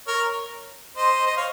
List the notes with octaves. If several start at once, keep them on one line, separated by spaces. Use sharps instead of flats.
A#4 C#5
C5 D#5
C5 D#5
C#5 F5